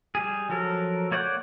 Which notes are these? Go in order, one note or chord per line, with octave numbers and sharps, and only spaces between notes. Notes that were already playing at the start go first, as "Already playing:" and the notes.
G3 G#4
F3 F#3 A4 A#4
A#3 C#5 D5 F#5 G6